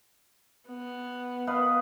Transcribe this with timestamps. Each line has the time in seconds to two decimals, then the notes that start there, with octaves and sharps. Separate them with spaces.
0.69 B3
1.47 B4 D#5 F5